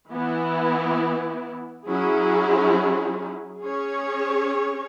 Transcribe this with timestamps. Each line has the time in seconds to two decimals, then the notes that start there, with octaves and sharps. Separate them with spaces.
0.11 E3 B3 E4
1.87 F#3 C#4 E4 G#4
3.63 C#4 G#4 C#5